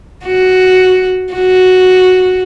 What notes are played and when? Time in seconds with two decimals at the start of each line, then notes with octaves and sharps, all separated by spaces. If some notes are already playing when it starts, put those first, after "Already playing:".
0.25 F#4
1.33 F#4